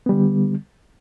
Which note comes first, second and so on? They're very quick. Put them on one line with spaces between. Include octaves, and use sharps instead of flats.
B3 G3 D3